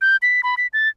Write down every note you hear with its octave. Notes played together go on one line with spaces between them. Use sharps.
G6
B6
B5
B6
A6